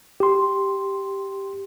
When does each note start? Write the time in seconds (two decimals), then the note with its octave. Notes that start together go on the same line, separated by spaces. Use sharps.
0.20 G4 C6